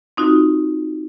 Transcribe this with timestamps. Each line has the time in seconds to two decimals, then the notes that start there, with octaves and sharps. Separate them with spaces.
0.17 C4 D#4 F4 F#4